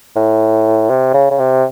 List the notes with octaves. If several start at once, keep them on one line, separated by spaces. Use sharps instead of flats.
A2
C3
C#3
C#3
C3